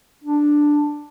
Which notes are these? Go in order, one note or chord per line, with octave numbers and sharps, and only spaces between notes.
D4